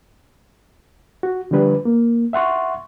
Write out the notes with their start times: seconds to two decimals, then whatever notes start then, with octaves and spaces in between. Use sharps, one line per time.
1.23 F#4
1.51 D3 F3 G3 D4 B4
1.85 A#3
2.33 E5 F#5 C6 C#6